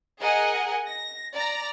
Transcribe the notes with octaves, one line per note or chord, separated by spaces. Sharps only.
G#4 A#4 D#5 F#5 G#5
A#6
D5 A#5 A#6